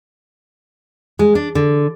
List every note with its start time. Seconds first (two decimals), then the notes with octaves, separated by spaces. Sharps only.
1.19 G#3
1.35 D4
1.55 D3